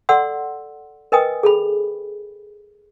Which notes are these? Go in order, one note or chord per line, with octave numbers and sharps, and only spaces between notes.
A4 D5 F#5 C6 E6
A#4 B4 D#5 G5 G#5 D#6
G#4 A4 B5